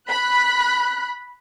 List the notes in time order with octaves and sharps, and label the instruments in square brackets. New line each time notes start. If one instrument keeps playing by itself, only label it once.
[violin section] B5 F#6